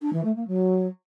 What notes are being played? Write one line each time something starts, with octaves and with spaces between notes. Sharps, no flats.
D4
E3
A3
A#3
F#3